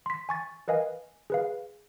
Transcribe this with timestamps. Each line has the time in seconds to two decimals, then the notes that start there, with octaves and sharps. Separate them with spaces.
0.06 C6 B6
0.29 G#5 C#6 A6
0.68 A#4 B4 D#5 F5 G#5
1.30 G#4 B4 F5